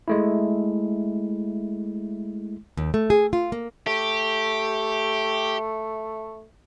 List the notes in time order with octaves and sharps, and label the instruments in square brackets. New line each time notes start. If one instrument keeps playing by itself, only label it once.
[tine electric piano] G#3 A3 E4
[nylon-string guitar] D#2
A3
G#4
F4
A#3
[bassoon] A3 [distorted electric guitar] G4